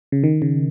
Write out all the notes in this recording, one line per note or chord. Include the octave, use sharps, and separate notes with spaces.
C#3
D#3
C#3